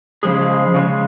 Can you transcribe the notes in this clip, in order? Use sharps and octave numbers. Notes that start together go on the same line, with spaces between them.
C#3 F3 G#3 G#4
C#3 F3 G#3